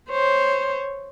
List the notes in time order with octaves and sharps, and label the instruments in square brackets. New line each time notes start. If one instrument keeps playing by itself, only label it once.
[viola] C5 C#5